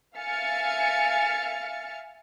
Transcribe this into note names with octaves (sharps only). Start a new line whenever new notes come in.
E5 F5 G#5 F6 A6 C#7